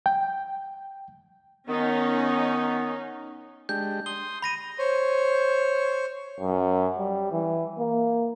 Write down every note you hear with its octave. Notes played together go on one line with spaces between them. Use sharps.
G5
D#3 B3 C#4 D#4
G#3 D4 G4 G6
C6 D#6 G7
B5 A#6 D#7
C5 C#5
F#2
G3
E3
A#3